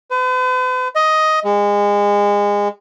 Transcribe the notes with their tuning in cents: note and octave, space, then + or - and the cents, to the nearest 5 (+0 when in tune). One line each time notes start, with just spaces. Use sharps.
B4 +45
D#5 +10
G#3 -25